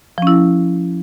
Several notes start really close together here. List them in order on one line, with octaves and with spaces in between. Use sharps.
F3 C#4 E4